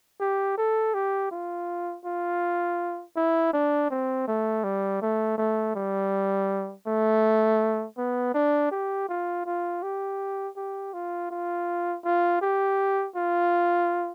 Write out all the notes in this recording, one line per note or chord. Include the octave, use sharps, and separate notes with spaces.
G4
A4
G4
F4
F4
E4
D4
C4
A3
G3
A3
A3
G3
A3
B3
D4
G4
F4
F4
G4
G4
F4
F4
F4
G4
F4